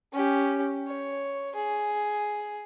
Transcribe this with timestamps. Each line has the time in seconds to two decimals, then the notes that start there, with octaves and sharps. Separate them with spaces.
0.13 C#4 G4
0.87 C#5
1.55 G#4